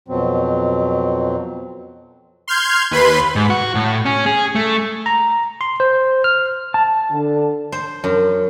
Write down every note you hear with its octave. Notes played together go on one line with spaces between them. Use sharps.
F2 B2 F#3 C4
C6 F6 G6 G#6
D#2 B4 B5 C6
G#2
F#4
A2
C#4
G#4
A3
A#5
C6
C5
F6
A5
D3
C5
F#2